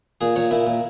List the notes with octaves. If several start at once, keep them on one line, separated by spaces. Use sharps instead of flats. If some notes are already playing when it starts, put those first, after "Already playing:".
A#2 G#4
A#2 C#5
A#2 E4
A#2